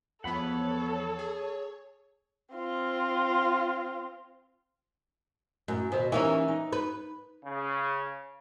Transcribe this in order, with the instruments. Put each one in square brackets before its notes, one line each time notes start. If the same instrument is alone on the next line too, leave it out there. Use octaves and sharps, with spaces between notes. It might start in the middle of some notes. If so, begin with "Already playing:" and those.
[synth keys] E2 F3 B3 [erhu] A4 [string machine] C#5 [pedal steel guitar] F#5 B5
[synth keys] G#4
[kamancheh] C4 F4
[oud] F#2 [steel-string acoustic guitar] A2
[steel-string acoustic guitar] D#2 C5 E5 [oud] B2
[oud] E3 A#3 C#4 [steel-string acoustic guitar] D#4 G4 G#5
[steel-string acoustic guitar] D#4
[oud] B4
[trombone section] C#3